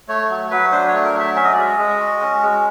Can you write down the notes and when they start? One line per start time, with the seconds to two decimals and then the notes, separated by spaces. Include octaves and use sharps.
0.08 A3 C#5
0.30 F#3
0.51 F#3 B4
0.72 D4 C5
0.88 A3 C#5
1.04 A#4
1.15 F#3 E5
1.35 C#4 E5
1.44 D#5
1.53 D5
1.58 G#3 D#5
1.79 G#3
2.00 F#4
2.21 C#4
2.42 G#3